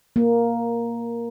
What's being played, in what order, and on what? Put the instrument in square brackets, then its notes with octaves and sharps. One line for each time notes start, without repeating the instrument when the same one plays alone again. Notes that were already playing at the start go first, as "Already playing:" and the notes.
[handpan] A#3